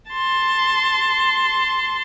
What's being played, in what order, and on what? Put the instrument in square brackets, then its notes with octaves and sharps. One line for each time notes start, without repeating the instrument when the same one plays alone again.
[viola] A5 C6